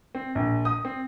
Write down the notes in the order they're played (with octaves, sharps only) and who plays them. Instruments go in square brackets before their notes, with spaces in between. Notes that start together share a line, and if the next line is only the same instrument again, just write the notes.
[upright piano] C4
A#1
D#6
C4